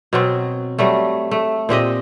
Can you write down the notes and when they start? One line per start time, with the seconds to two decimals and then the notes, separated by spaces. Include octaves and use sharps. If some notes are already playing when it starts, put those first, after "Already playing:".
0.13 B2 F#3 C4
0.78 F#3 G3 A3
1.31 A3
1.69 A#2 C4 G4 D#5